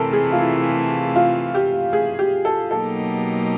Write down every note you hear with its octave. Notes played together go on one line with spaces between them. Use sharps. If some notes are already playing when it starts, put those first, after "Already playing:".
Already playing: C3 E3 A3 A4 A#4
G#4
F4
E4
F4
G4
G#4
G4
A4
B2 F#3 A#3 D#4 G4 A4